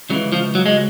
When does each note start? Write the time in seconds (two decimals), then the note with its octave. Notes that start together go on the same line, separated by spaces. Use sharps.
0.09 C#2 C#3 E3 F#3
0.32 F3
0.55 F#3
0.66 G#3